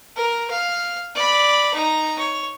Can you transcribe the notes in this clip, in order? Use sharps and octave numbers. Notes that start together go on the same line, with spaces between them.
A#4
F5
D5 B5
D#4 A#5
C#5